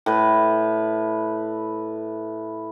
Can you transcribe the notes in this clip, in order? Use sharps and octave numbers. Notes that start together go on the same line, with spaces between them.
A2 B4